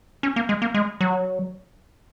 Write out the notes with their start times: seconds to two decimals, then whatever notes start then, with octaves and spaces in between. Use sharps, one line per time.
0.23 C#4
0.36 A#3
0.49 G#3
0.62 A#3
0.74 G#3
1.01 F#3